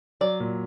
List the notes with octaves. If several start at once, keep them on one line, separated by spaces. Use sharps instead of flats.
F#3 D5
A#2